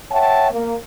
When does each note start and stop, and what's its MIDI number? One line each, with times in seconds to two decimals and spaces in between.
0.11 0.51 73
0.11 0.51 76
0.11 0.51 78
0.11 0.51 79
0.11 0.51 81
0.51 0.74 58